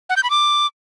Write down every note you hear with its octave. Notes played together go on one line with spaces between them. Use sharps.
F#5
G6
B5
D6